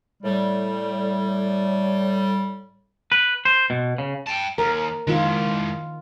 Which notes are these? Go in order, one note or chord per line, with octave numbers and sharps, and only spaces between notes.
A2 G3
B4
C5
B2
C#3
G5 A5
D#2 A#4
D#3 G#3 E4 F4